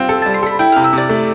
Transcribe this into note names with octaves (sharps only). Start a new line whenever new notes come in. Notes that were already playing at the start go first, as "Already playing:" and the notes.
Already playing: G3 C4 F4
A4
G3 A5
C6
A4 B5
E4 G5
C3 F5
E5
C3 D5
A3